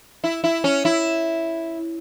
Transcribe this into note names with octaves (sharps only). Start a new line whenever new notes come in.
E4
E4
C#4
E4